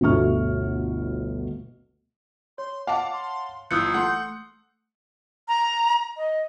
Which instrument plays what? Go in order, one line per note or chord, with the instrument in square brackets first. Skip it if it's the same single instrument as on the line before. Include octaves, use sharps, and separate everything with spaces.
[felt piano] G1 D2 B2 A3 C#6 F6
[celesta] C#5 [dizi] C6
[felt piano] F5 F#5 A5 [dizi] D6
[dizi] C6
[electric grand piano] G1 F4 F#6 [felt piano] E3 [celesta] D#6 E6 C#7 [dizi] G6
[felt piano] A3 [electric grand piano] F#5 C6
[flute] A#5
D#5